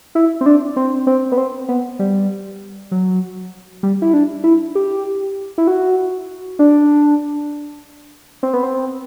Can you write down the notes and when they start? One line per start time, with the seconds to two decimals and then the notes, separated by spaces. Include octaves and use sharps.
0.15 E4
0.41 C4
0.46 D4
0.76 C4
1.07 C4
1.32 B3
1.38 C4
1.69 B3
1.99 G3
2.91 F#3
3.83 G3
4.02 E4
4.13 D4
4.44 E4
4.75 G4
5.58 E4
5.67 F#4
6.59 D4
8.43 C4
8.53 B3
8.63 C4